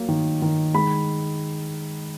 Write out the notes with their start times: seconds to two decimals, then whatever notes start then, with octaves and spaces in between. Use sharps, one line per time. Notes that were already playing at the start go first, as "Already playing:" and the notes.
Already playing: F#3 A#3
0.08 D#3
0.42 D#3
0.74 G#3 B5